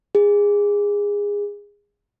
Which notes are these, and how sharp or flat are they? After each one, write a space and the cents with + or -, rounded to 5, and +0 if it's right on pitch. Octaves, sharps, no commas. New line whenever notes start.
G#4 -20